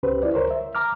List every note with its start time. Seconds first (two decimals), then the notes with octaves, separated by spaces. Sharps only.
0.03 C#2 C#4 G4 B4 C5
0.23 E4 F4 D5
0.34 C#2 A#4 C5 C#5
0.51 E5
0.75 A#5 D6 F6